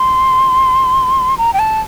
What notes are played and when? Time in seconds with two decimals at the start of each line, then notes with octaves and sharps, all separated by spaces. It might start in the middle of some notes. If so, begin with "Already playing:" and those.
Already playing: C6
1.38 A#5
1.53 G5
1.59 A5